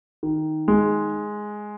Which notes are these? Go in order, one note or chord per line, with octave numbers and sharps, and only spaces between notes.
D#3
G#3